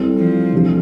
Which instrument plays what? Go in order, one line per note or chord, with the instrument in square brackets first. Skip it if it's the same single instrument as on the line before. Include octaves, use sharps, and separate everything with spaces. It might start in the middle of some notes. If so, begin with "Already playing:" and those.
Already playing: [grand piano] G3 C4 E4 A4 C5
[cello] F3
[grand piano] C3 E3 A3 D4 G4